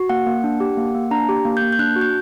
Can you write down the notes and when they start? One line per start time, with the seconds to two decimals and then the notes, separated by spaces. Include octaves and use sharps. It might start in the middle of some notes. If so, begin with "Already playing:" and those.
Already playing: F#4
0.09 A#3 F#5
0.26 A#3
0.44 D4
0.60 G4
0.77 A#3
0.95 A#3
1.11 D4 A#5
1.29 G4
1.45 A#3
1.57 G6
1.62 A#3
1.73 G6
1.79 D4 F#6
1.96 F#4
2.01 G6